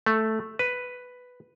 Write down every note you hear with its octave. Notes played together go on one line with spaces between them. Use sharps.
A3
B4